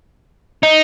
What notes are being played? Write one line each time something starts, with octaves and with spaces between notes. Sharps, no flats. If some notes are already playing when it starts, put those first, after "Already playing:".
D#4